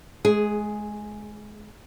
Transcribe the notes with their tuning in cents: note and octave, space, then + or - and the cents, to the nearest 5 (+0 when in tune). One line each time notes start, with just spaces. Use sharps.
G#3 +25 G#4 +0